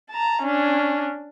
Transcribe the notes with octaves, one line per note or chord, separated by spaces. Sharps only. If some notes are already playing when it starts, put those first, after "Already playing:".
A5 A#5
C#4 D4